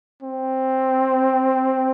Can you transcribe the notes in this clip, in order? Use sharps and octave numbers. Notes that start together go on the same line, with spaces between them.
C4